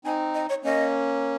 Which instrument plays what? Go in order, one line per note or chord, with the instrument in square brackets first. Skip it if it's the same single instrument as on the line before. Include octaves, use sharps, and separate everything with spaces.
[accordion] C4 D#4 [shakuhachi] G#5
[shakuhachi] D#5
C#5
[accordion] A#3 C#4 [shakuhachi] D#5